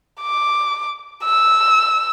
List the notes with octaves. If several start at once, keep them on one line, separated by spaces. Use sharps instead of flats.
D6
E6